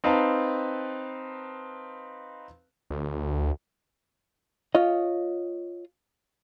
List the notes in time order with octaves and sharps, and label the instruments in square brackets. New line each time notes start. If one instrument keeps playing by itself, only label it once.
[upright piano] C4 D#4 B4 F5 A5
[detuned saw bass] D2
[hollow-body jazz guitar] F4 C#5 D#5